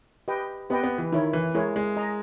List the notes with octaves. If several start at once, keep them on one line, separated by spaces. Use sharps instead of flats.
G4 B4 D#5 G5
B3 G4 B4 D#5 G5
B3
E3
D#3 E4 A#4 C#5
E3
G#3 E4 A#4 C#5
G#3
G#4 D#5 A#5